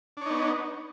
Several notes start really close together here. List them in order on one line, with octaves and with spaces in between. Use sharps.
D4 C#5 D#4 B3